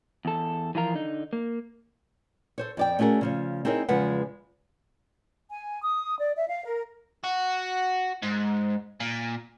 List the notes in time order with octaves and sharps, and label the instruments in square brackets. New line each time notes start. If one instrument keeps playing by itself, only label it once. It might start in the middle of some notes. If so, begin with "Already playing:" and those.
[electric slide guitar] E2 A4
E3 F3 F4 A#4
D3 D#4
A#3
[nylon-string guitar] A4 C5 C#5
F2 D5 G5
A3 C#4 F#4 G#4 A#4
C#3 F3 C#5
C4 D#4 E4 G#4 A#4 C#5
E2 C#3 F3 G#3 B4 F#5
[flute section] G#5
D#6
D5
E5
F5
A#4
[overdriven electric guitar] F#4
G#2
A#2